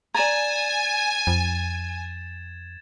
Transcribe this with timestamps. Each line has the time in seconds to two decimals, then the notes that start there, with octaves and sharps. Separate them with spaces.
0.14 D5 G#5 A#5 G#6 A6 E7
1.27 F2